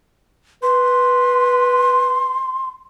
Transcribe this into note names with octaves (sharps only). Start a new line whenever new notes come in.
B4 C6